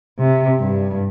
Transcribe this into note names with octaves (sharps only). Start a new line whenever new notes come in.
C3
G2